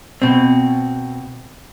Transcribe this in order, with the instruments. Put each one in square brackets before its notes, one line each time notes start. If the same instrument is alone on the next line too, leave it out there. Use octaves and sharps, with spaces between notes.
[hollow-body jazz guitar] B2 C4